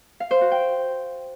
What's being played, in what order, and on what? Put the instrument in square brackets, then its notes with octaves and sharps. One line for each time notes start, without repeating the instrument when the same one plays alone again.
[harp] F5
C5
F#4
G5